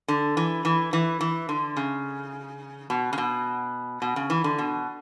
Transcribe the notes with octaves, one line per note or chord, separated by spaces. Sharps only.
D3
E3
E3
E3
E3
D3
C#3
B2
C#3
B2
B2
C#3
E3
D3
B2